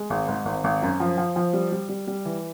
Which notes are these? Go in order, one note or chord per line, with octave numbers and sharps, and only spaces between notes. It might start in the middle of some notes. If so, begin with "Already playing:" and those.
Already playing: G#3
G#1
G#2
G#1
G#1
F#2
F3
F3
F3
G3
G3
G3
G3
E3